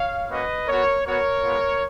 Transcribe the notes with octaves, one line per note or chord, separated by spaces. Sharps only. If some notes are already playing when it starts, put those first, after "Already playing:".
Already playing: C#5 F5
A#3 C#4 F#4 B4 D#5
B3 F#4 A#4 C#5
B3 F#4 A#4 C#5
G#3 B3 F4